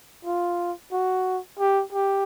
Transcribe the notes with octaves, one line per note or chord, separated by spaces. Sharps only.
F4
F#4
G4
G4